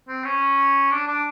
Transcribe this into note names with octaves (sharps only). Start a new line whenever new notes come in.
C4
C#4
D4
D4